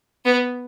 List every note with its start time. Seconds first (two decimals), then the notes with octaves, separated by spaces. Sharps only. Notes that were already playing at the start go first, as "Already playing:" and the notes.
0.25 B3